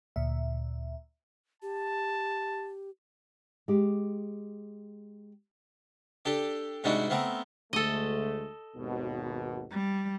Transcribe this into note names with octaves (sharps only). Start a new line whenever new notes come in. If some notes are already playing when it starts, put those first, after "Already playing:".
D2 A#2 E5
G4 A5
G#3 G4
D4 G4 A4
G#2 C3 G3 D4 D#4 F#4
A3 B3 C4 A#4
D2 G#3 A3 A4 D#5
G#1 D#2 B2
G3